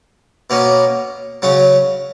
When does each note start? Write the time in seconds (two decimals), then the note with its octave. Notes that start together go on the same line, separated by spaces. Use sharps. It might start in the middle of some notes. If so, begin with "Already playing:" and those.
0.50 B2 A#3 C#4
1.42 C#3 F#3 C#4